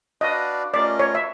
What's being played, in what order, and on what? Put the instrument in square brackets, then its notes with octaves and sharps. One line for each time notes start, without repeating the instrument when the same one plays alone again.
[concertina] D4 F#4 B4 D5 F5 [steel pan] D#5
[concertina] A3 C#4 F4 A#4 D#5 [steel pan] D5
[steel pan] C#5
E5